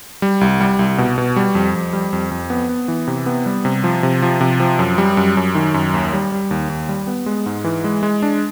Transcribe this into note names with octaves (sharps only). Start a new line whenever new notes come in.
G3
C2
G3
C2
B2
B2
G3
F2
F2
G3
F2
F2
B3
B3
E3
C3
B3
G3
C3
F3
C3
F3
C3
F3
F#2
G3
F#2
F#2
D#3
F#2
D#2
G3
G3
D#2
D#2
G3
B3
G#3
G#2
E3
G#3
G#3
D4